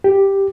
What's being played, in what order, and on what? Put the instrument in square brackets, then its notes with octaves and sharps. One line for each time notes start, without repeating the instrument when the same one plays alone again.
[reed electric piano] G4